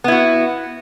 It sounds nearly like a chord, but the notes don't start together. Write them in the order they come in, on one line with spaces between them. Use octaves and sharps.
B3 E4 F#4